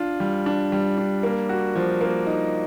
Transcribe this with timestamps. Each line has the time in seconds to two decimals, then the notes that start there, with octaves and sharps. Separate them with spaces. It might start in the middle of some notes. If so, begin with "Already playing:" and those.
Already playing: D4 F4
0.20 G3
0.46 D4
0.72 G3
0.97 D4
1.23 A#3
1.49 F#4
1.76 F3
2.01 A#3
2.27 D#4